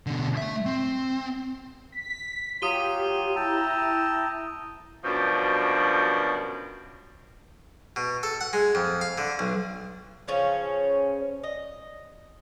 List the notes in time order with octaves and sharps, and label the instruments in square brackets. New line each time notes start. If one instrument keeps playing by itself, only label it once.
[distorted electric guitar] B2 D3
A3 E5
C4
[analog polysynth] B6
[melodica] F#3 F4 C6 [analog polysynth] G4 [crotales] D#6 D#7 G7
[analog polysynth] E4 A#5 [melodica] G5 A5 E6
[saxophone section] F#2 B2 F3 G3 D4
[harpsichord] B2
A4
F#5
G#3
F2
F5
D3
B1
[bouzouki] C#3 F3 C#4
D#5